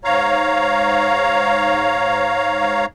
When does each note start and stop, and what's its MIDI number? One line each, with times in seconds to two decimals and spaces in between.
0.04 2.86 44
0.04 2.86 73
0.04 2.86 77
0.04 2.86 82